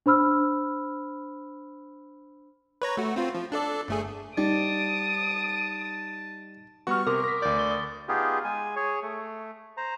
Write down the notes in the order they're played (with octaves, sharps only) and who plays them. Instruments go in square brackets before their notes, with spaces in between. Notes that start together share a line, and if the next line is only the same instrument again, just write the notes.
[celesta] D4 C5 B5 E6 F6
[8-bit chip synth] B4 C#5 A#5
A3 F#4
C4 F4
F3
D4 A4 D5
G1 A3 G#4
[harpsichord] G3 [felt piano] D#4 [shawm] A5 [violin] D#6 D7
[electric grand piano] G3 B3 F#4 [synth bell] C#6 F6
[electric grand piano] C3 [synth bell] A#4 [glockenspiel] C6 D6 D#6
[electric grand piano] A#6 B6
[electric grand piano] D2 G6 [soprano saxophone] D5
[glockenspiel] C#6 A6 G7
D#6
[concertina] B3 D#4 F4 G4 G#4
G#3 G#5
G#4 C#5
A3
C5 A#5